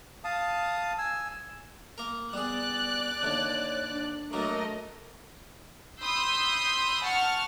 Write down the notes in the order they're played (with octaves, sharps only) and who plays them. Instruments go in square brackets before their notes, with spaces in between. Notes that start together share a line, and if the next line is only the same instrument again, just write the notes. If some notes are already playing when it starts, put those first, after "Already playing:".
[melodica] F5 A5 D#6
G#5 E6
[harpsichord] A#3 A#4
[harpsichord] G3 G#4 [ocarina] B3 [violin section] D5 F#6
[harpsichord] D#2 D3 [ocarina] C#5
[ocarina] D4
[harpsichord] F#3 A#3 [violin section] A3 A#4 D#5
[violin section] B5 C6 D#6 E6 G6 C7
F#5 A5 C#6 F6